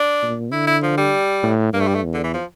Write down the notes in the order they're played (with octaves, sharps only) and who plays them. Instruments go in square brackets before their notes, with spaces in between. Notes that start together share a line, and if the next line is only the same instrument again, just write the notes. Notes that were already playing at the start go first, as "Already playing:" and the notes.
Already playing: [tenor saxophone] D4
[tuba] A#2
[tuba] D3 [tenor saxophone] E4
[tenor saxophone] E4
F3
G3
[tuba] A2
[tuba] G2 [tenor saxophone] A#3
[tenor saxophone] A3
G3
A3
[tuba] E2
[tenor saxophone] D3
E3
F3